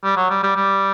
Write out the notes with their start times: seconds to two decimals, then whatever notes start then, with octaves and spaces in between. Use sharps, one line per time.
0.04 G3
0.17 F#3
0.30 G3
0.43 G3
0.56 G3